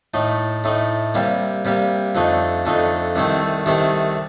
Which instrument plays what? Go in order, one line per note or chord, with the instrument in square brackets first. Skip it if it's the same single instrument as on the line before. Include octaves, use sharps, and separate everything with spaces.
[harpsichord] A2 A3 D#4
A2 A3 D#4
C3 G3 A#3
C3 G3 A#3
F2 D3 A3 D#4
F2 D3 A3 D#4
C2 C3 D#3 A3 C4
C2 C3 D#3 A3 C4